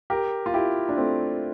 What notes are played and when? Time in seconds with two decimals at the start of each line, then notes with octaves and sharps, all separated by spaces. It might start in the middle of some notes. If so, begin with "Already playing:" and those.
0.10 G4 A#4
0.46 F4
0.54 E4 G4
0.89 D4
0.97 A3 C4